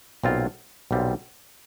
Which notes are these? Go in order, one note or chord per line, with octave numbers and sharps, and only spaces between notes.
B1 A#2 G3 C4 F4
B1 A#2 G3 C4 F4